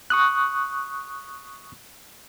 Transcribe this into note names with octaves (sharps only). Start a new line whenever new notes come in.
C#6 D#6 F#6